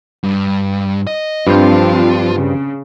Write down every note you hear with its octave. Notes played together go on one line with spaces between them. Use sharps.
G2
D#5
G2 F3 C4 D4 F4 C5
C#3